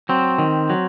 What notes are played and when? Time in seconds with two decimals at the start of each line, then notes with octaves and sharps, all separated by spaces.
0.09 F#3 C4
0.38 D#3
0.70 F#3